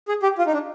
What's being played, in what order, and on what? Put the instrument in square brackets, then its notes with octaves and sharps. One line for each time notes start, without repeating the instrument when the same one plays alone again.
[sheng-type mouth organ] G#4
G4
F4
D#4
D4